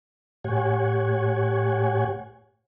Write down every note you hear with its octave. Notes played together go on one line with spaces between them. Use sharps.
A2 G4 C#5 F#5 G#5